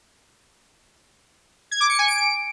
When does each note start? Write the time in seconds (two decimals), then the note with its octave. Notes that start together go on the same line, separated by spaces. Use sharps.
1.71 G#6
1.80 D6
1.90 C#7
1.99 G#5
2.08 D7